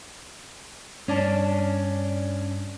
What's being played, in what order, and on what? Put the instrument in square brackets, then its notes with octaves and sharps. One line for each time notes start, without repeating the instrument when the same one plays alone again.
[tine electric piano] G2 D5 A5 [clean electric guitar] C#4 D4